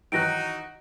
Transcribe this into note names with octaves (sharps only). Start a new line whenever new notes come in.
D#3 E3 F#3 D#4 F#4 F#6 A#6 D7